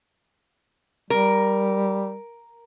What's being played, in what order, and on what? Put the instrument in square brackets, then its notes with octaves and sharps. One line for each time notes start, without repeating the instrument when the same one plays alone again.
[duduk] G3 [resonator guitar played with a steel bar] A#4